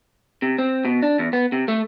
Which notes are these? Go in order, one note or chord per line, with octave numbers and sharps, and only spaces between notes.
C3
C4
B2
D4
E2
B3
C3
A3